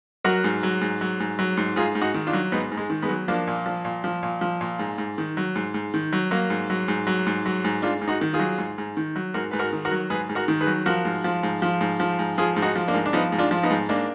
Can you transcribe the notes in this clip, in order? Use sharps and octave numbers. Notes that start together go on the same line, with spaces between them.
F#3 F#4 A#4
G#2
F#3
G#2
F#3
G#2
F#3
G#2
G#2 F4 G#4
G#2
D#4 F#4
D#3
D4 F4
F#3
G#2 B3 D#4
G#2
G#3
D#3
G#3 B3
F#3
F3 A#3 D4
A#2
F3
A#2
F3
A#2
F3
A#2
G#2
G#2
D#3
F#3
G#2
G#2
D#3
F#3
F#3 A#3
G#2
F#3
G#2
F#3
G#2
F#3
G#2
G#2 D4 F4
G#2
D#4 F#4
D#3
F4 G#4
F#3
G#2
G#2
D#3
F#3
G#2 F#4 A#4
G#2 B4
F#4 A#4
D#3
F#4 A#4
F#3
G#2 G#4 B4
G#2
F#4 A#4
D#3
G#4 B4
F#3
F3 F#4 A#4
G#2
F3
G#2
F3
G#2
F3
G#2
F3 F4 G#4
G#2
D#4 F#4
F3
A#3 D4
G#2
D4
F3 B3 D#4
G#2
D4 F4
F3
B3 D#4
G#2
G#2 A#3 D4